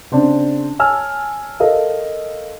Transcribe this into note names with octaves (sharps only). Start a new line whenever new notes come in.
C#3 C4 D4
C#5 G#5 A5 E6 F6
A4 A#4 D#5 F5